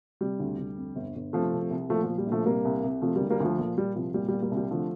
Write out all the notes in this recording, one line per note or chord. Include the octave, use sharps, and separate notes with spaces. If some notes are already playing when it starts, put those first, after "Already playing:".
C3 G3
D2
D2
F2
G1
G1
C3 F3 A3
C2
C2
A#2 F3 A3
F3
A#2
G3
A#1
F3 A3
C3 G3 A#3
C2
C2
C3 F3 A3
D2 G3 A#3
G3 A#3
D2 F3 A3
A#2 F3
A#2 G3
C2 F3
A#2 G3
A#2 G3
G3 A#3
C2
G3
D3 F3 A3